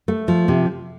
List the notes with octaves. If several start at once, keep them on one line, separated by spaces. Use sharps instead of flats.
A3
F3
C3